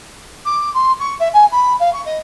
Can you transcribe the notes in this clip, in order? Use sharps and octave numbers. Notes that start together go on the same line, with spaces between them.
D6
C6
C#6
E5
G#5
B5
F5
C#6
D#5